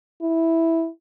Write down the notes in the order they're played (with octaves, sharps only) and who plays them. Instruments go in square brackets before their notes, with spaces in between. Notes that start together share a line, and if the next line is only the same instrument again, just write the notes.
[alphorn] E4